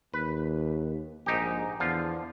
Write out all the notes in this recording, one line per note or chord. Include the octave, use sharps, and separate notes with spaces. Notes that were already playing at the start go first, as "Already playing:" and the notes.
D#2 B4
A#1 G#2 D#4 G4
E2 D3 F3 F4